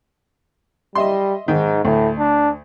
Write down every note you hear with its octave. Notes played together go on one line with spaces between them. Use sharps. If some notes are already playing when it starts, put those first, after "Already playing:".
G3 D#5 E5 C6
G#2 D#3
D2 A2
D4